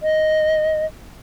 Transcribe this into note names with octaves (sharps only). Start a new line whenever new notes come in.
D#5